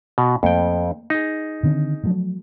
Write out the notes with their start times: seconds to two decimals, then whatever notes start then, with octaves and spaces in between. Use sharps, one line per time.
0.18 B2
0.43 F2 A3 A#3 G5
1.10 D#4 G#4
1.63 D3 D#3 C4
2.03 F3 F#3 A3